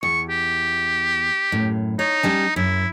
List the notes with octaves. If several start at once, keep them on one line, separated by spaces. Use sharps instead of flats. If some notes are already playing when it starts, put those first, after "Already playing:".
E2 C#6
G4
F#2 A2
D#4 C#5
G3 C#4 A5
F#2 E4